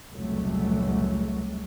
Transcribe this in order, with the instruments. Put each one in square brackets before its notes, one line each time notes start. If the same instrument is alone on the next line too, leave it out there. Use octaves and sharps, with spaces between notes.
[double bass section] F1 C#2 A#2 F#3 G3 A3